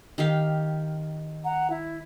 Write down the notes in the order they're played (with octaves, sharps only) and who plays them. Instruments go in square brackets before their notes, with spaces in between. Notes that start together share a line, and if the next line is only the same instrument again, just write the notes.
[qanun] D#3 G4 F5
[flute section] F#5 A#5
E4